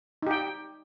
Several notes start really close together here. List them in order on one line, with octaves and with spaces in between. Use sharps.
D#4 G4 G5